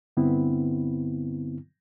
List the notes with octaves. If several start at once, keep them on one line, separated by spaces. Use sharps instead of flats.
G2 D3 B3 C4 E4